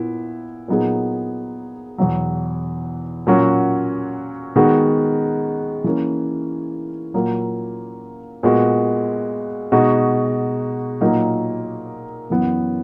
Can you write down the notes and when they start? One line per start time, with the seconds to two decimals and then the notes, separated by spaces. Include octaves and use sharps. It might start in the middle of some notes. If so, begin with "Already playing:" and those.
Already playing: A#2 B3 E4
0.68 A#2 F#3 B3 D#4 G#4
1.98 E2 B2 F#3
3.27 A#2 F#3 C#4 F#4
4.56 D#3 G#3 B3 F#4
5.84 E3 A#3 C#4
7.14 A#2 F#3 A#3
8.43 A#2 G#3 B3 F#4
9.72 B2 G#3 D#4 F#4
11.01 A#2 F#3 A#3 D#4
12.30 F#2 E3 B3